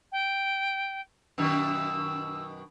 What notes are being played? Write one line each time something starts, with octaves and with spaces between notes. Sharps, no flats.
G5
F#2 B2 D#3 E6